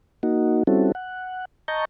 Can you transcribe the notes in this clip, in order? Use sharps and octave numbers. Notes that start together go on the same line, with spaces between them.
A#3 D#4 F#4
G3 C4 C#4 E4 F#4 A4
F#5
D#5 A5 A#5 C#6 G6